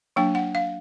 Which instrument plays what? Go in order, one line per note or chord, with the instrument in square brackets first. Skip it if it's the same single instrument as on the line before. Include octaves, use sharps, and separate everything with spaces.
[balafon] F#3 A#3 D4 G5
F#5
F5